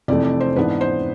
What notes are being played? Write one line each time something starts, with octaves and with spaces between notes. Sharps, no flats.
F1 F2 E3 A3 D5
D5
C5
G#2 E3 B3 D4 B4
C5